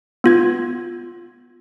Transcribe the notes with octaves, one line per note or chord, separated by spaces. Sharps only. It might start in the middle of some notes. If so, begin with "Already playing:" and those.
B3 F4 G#6